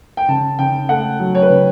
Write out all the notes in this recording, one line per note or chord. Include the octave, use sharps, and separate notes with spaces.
G5
C#3 A5
C#3 G5
A3 F#5
F#3
C#5
B4
C#3